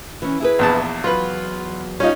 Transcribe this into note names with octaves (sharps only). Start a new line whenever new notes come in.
E3 C#4
E4 G#4 B4
A#1 E2 A5
E2 F#3 F4 B4
G3 C#4 D#4 F4